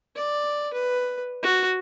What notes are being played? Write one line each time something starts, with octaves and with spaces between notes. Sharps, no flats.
D5
B4
F#4